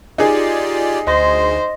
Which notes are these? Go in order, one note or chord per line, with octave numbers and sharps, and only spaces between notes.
D#4 F4 G4 G#4 D5
D2 C5 D#5 C6 A#6